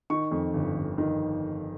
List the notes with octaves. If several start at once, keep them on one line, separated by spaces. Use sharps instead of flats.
D#3 C#6
F2
G1
G1
D#3